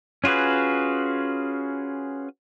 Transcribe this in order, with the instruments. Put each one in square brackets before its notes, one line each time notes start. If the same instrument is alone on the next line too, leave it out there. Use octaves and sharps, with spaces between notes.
[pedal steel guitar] C#4 F4 F#4 G#4 B4